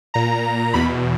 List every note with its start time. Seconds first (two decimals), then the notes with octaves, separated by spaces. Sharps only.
0.14 A#2 A#5
0.74 E2 B2 B5